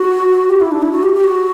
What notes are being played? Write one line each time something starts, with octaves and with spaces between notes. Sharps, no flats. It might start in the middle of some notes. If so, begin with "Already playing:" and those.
Already playing: F#4
G4
E4
D4
E4
F#4
G4
G4
F#4